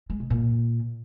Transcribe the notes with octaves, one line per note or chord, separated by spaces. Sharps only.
G#3
B2
A#2